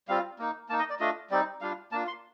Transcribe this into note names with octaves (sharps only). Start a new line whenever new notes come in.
G3 C4 F4 F5
A#3 D#4
A#3 D#4 A5
D#5
D5
A3 D4 F4 D#5
G3 C4 D#4 D5
G3 D4 F4 F5
A#3 D4 F4 A5
C6